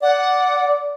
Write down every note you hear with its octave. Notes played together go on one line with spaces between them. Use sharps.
D5 F#5